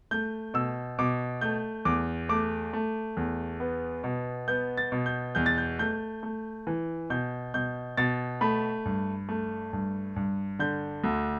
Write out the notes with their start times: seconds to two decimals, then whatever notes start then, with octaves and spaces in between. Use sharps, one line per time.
0.11 A3 G6
0.54 B2 E6
0.99 B2 D6
1.41 A3 G6
1.85 E2 D6
2.29 A3 D6
2.73 A3
3.17 E2
3.60 B3
4.04 B2
4.48 B3 G6
4.77 A6
4.92 B2
5.06 G6
5.35 E2 G6
5.46 A6
5.58 G6
5.79 A3 G6
6.23 A3
6.67 E3
7.10 B2 G6
7.54 B2 G6
7.97 B2 A6
8.41 A3 B5
8.86 G2
9.29 A3
9.73 G2
10.16 G2
10.59 D3 G6
11.04 D2